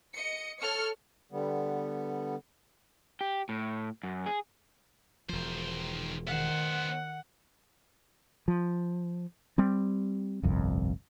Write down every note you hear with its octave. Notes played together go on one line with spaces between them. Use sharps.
D#5 C#7
A4 C#5 F6 C#7
D3 G3 B3
G4
A2
F#2
G#4
E1 D#3 F3 C5
D#3 B3 C5 F#5
F3
G3 C4
G1 C2 F2